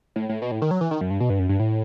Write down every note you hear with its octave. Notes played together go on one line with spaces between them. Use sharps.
A2
A2
B2
A2
D#3
F#3
E3
D#3
F#2
G2
B2
G2
F#2
G2
A2